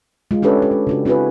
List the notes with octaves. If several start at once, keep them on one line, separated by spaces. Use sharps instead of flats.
G#3 F4
C#4 D4 G4 A4 B4 C#5
G#3 G4
G#3
C#3 D4 F#4
C4 E4 F#4 G#4 B4